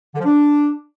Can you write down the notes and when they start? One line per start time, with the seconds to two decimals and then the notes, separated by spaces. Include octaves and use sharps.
0.15 D3
0.20 F3
0.25 D4